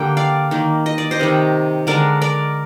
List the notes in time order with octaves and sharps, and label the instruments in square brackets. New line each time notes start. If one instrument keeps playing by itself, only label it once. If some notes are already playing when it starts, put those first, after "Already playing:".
Already playing: [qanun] D3 G3 A#3 G5
D5 F5
D#3 A#3
D#5
D5
C5 D#5
C3 D#3 G3
D3 G#3 A#4 D5
A#4 D5